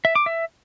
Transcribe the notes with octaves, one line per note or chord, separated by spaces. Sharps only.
E5
D6
E5